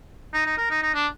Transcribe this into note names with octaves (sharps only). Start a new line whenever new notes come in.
D#4
D#4
A#4
D#4
D#4
D4